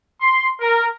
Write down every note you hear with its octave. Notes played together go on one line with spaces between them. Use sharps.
C6
A#4